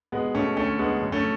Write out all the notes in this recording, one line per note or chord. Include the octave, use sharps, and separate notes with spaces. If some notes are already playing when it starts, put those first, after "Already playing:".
B2 G#3 B3
B2 A3 C#4
D2 A3 C#4
D2 G#3 B3
F#2
A3 C#4